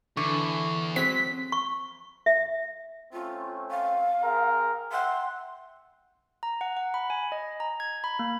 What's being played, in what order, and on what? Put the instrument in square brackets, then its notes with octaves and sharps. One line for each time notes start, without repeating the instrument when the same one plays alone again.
[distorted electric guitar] E2 [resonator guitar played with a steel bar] D3 [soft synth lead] C#6
[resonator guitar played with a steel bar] F#3 G#3 [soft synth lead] C4 [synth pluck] B6
[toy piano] C#6
E5
[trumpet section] A3 C4 C#4 [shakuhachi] F4
[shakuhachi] F5
[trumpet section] C4 G#4 A#4
[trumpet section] E5 F#5 G5 [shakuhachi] C6
[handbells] A#5
F#5
F#5
B5
G#5
D#5
A#5
G#6
B5
A#3